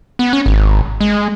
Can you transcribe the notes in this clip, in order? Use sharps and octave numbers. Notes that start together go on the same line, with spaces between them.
B3
C#4
G#1
G#3